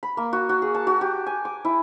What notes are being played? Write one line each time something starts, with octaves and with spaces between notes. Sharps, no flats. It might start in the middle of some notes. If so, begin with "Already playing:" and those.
B5
A#3
F#4
F#4
G#4
A5
F#4
G4
G#5
D6
E4